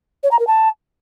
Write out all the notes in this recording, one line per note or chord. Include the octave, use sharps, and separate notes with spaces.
C#5
A#5
A#4
A5